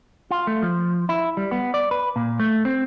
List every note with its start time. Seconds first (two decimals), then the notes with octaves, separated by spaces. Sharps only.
0.31 F4
0.47 A3
0.63 F3
1.09 E4
1.37 G3
1.51 B3
1.74 D5
1.91 B4
2.16 A#2
2.40 A3
2.65 C4